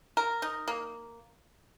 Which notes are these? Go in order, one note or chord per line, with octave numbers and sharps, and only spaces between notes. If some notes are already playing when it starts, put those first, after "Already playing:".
A#4
D#4
A#3